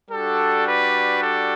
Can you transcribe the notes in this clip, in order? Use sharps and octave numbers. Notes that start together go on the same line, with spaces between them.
G3 D4 F#4 A4
B4
A4